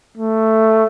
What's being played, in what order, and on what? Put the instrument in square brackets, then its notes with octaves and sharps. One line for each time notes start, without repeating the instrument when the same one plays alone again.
[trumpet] A3